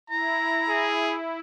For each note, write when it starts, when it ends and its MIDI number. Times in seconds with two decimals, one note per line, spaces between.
0.10 1.40 64
0.10 0.89 82
0.69 1.18 68